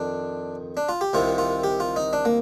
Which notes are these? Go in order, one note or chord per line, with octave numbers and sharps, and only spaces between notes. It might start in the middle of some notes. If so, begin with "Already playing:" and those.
Already playing: F2 D#3 D4
D4
F4
G4
C2 C3 D#3 F4
F4
G4
F4
D#4
D4
A#3